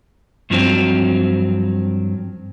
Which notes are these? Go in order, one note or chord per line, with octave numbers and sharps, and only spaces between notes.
G2 F3 F#3 C4